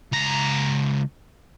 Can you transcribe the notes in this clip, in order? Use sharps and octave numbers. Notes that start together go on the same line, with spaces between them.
C#2 A#5